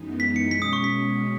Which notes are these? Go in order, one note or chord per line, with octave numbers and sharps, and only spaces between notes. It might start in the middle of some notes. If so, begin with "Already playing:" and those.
Already playing: F#2 E3 G#3 B3 D#4
B6
C#7
B2 G#3 C#4 B6
D#6
C#6
B6